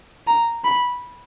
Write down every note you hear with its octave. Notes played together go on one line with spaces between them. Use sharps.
A#5
B5